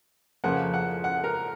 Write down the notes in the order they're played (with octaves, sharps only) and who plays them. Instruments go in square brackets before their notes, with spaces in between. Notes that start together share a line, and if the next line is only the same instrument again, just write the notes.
[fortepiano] F2 C#3 F3 A#3 F#5
F#5
F#5
A#4